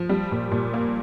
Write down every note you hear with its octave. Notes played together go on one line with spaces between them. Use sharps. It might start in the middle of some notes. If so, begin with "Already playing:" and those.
Already playing: F3
G3
A#2
A#2
A#3